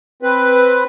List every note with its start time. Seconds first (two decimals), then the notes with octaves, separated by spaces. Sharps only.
0.23 C4 B4